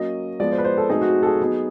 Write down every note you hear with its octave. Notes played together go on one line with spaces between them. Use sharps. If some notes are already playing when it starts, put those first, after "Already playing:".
Already playing: F#3 A#3 C#4 D#5
F3 G#3 B3 D5
C5
B4
C5
A4
F#3 A3 C4 D#4 G#4
F#4
A4
G#4
F#3 B3 D#4